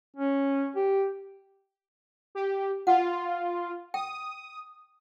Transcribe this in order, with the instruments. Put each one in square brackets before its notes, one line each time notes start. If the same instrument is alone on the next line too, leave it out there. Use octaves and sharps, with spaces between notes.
[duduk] C#4
G4
[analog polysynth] G4
[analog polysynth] F4 [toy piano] F#5
[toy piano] G5 [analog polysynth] D#6